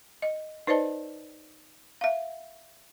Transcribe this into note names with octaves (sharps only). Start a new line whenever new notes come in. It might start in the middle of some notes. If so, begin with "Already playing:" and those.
D#5
D#4 B4 C5 D5 D#5 A5
E5 F5